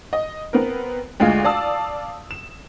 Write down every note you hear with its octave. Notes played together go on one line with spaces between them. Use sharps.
D#5
B3 C4 A#4
D2 G#3 F4 F5
D5 F5 A5 D#6 E6
E7